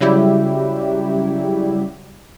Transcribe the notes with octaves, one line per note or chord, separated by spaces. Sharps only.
C#3 F#3 G3 E4 G4